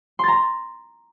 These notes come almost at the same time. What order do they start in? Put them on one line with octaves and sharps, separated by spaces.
C6 A6 A#5